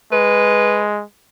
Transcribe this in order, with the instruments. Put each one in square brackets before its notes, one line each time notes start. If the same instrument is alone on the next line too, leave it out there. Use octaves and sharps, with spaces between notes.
[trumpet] G#3 [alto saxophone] B4